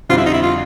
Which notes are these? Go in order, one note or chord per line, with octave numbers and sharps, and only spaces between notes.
F2 D3 G3 C4 F4
E4
D#4
E4
F4